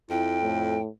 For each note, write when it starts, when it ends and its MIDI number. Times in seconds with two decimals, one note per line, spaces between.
0.10 0.77 41
0.10 0.41 64
0.10 0.80 79
0.42 0.88 45